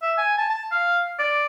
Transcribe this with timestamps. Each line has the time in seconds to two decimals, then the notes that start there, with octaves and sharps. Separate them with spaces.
0.02 E5
0.18 G#5
0.38 A5
0.50 A5
0.72 F5
1.19 D5